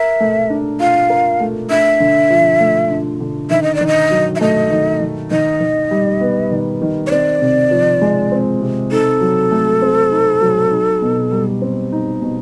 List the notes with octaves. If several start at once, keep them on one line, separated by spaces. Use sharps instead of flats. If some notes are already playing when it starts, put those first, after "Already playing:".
Already playing: A#4 E5
A3
D4
F4 F5
A#4
A3
D4 E5
D3
F3
A3
D4
D3
D#3 E5
D#5
D5
D#3
D#5
F#3
E5
A3 D#5
D#3
D#3
D#3 D#5
D#3
G3
B3
D#3
D#3
C#5
C4 D5
C3
F3
G#3
C4
C3
D#4 A4
F#3
A3
C4
D#4
F#3
D#4
B2
G3
C4
D#4
B2